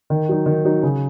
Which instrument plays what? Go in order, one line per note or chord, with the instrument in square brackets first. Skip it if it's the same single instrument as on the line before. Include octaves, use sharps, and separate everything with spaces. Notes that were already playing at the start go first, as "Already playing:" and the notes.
[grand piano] D#3
F#3 D#4
D#3
F#3 D#4
C#3